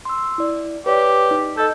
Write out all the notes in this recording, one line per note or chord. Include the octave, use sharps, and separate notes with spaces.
C6 E6
E4 D5
G4 B4 C#5 D5
D#4
A4 D#5 G6